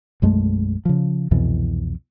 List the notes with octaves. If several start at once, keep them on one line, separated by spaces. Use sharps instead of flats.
B1 F#2 G#3 A3
C#3 F3
C2 F2 B2 E3